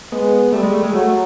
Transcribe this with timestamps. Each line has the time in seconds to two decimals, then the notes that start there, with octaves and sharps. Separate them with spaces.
0.12 G#3 B3
0.52 G3 A3
0.63 G#3
0.73 A3
0.84 G#3
0.93 F#3 A3